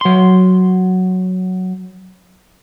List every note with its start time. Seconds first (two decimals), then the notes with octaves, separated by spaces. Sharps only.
0.01 F#3 C6